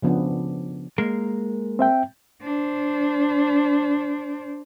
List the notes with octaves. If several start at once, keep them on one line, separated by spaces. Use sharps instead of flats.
C#3 F3 B3 C#4 D4
G#3 A#3 A#4
C4 E5 G5
D4 C5